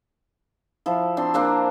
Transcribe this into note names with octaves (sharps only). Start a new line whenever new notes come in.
F3 E4
C4 D4 C6
A#3 C4 D4